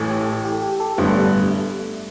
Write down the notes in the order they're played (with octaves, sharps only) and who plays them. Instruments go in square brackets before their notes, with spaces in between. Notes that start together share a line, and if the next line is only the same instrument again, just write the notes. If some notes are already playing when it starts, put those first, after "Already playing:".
Already playing: [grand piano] A1 A2 E3 [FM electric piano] A4
[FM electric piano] G4
A4
G4
G4
A4
[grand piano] A1 G2 D3 B3 [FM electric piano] A3
[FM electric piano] G3
G3
A3